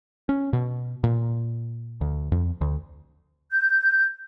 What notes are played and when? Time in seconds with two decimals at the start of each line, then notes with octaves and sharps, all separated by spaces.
0.29 C#4
0.53 B2
1.04 A#2
2.01 D2
2.32 F2
2.61 D2
3.51 G6